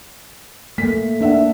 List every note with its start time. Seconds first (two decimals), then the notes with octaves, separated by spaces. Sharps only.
0.78 A3 A#3 B6
1.20 A#3 D4 E5 F#5